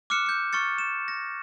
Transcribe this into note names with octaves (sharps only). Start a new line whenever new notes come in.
D6 F6 F#6 C#7 E7
G6 C#7
C#6 F6 A6 C#7
E7
A#6